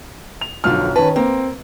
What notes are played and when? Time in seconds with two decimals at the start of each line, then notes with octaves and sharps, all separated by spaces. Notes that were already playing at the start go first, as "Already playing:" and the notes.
0.41 F7
0.64 B1 F#2 D3 F3 F6
0.96 D#3 C#4 B4 A5
1.16 A#3 C4